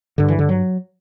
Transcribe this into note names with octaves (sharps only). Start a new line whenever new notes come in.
G2 D3
E3
D3
F#3